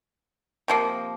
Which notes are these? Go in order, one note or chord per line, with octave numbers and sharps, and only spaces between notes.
C3 F3 A#3